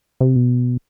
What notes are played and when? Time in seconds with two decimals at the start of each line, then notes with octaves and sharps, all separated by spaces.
0.21 C3
0.36 B2